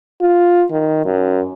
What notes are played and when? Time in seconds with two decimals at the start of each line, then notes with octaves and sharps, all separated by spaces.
0.21 F4
0.71 D#3
1.06 F#2